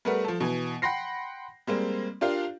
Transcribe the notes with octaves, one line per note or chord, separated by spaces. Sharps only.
G3 A3 B3 A#4 B4 F#5
F3 A4
B2 E3 G#5
F#5 G5 B5 C6 A#6 C7
G3 G#3 A#3 C4
D4 F4 G4 A#4 F5